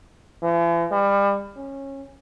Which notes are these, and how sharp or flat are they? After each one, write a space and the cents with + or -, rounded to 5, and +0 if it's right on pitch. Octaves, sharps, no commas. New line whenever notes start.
E3 +45
G3 +30
C#4 -20